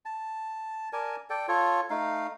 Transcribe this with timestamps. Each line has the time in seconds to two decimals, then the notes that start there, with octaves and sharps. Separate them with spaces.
0.05 A5
0.93 A#4 D5 G#5 A5
1.30 A4 D5 G5
1.48 F4 A4 C#5
1.90 A3 D#4 F5